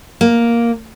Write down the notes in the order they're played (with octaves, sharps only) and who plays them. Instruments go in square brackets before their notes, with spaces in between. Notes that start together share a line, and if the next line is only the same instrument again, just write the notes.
[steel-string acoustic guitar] A#3